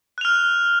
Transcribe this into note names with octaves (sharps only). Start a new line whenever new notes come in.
F6 F#6 F7